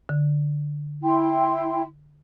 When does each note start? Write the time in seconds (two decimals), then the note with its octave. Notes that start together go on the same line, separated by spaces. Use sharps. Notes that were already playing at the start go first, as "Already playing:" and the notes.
0.09 D3
1.03 E4 G5 C6